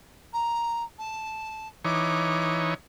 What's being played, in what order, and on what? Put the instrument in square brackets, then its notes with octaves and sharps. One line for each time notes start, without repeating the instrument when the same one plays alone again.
[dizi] A#5
A5
[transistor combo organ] E3 D#4 C#5 [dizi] D6